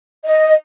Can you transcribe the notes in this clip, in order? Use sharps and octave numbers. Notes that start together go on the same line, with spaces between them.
D#5